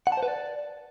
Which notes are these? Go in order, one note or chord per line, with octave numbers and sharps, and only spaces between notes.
F#5
A5
C5
B4
D5